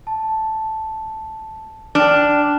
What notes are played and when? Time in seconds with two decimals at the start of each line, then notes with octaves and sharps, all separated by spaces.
0.07 A5
1.95 D4 G5 A5 F6